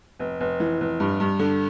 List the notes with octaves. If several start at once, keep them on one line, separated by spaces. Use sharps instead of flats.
F1
F1
E3
F1
G2
G2
D3